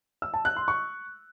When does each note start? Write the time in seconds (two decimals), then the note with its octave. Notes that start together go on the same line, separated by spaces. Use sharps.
0.22 E6
0.34 A5
0.45 F#6
0.56 C6
0.68 C#6